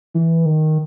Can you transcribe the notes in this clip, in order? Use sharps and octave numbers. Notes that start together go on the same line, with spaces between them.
E3
D#3